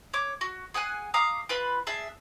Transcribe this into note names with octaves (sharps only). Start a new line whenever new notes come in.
C#5 D6
F#4
G#4 F#5 G#5 F#6
F5 A#5 D6 D#6
F4 B4 B5
D4 G#4 E5 A5